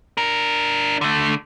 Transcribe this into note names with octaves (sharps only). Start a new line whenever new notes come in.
D4 A#4
D3 A3